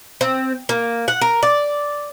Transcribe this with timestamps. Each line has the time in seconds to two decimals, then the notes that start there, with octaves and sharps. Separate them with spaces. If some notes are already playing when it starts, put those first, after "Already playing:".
0.21 C4
0.69 A#3
1.08 F#5
1.21 A#4
1.43 D5